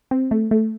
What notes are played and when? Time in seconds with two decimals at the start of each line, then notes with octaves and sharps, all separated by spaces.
0.11 C4
0.31 A3
0.51 A3